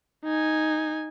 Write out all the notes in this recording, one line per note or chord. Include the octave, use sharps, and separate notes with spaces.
D#4 G#5